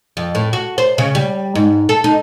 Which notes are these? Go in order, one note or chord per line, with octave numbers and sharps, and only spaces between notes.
F2
A2
F#4
C5
C#3
G3
G#2
A4
D#4